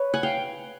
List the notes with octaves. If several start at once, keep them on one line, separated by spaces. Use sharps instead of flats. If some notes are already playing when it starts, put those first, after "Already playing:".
Already playing: B4 C#5
F#5 G#5
F5 G5